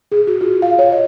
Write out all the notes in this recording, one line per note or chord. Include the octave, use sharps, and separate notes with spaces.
G#4
F#4
F4
F5
C#5
D#5